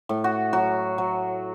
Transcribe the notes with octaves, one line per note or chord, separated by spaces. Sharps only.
A2
F#4
F#3 F#4
F#3